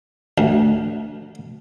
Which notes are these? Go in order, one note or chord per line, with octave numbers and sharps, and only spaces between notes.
D2